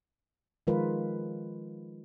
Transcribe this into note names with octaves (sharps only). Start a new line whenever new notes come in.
D#3 F3 G#3 F4 A#4 B4